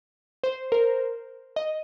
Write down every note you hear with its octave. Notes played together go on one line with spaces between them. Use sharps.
C5
A#4
D#5